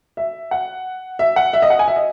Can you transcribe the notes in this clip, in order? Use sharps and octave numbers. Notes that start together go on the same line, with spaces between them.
E5
F#5
E5
F#5
E5
D#5
F#5
G#5
E5
D#5